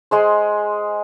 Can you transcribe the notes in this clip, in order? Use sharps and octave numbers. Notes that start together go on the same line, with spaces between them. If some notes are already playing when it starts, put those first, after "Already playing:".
G#3 G#4 C5